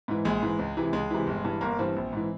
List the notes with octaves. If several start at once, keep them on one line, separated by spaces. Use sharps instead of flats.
G#2 E3
A#1 G#3
G#2 E3
C#2
C3 E3
C#2 G#3
C3 E3
G1
G2 E3
G1 A#3
G2 E3 C4
A#1
G#2 E3